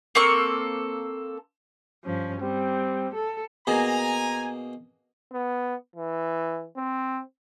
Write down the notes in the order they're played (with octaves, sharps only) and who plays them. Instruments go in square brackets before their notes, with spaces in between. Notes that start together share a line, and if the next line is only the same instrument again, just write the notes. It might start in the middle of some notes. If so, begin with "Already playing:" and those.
[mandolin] A#3 C4 A4 C#6
[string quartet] G2 F3 C#4
[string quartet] G3 [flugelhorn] C4
[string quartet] A4
[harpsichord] B2 A#3 G#4 [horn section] G#5 A#5
[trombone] B3
E3
C4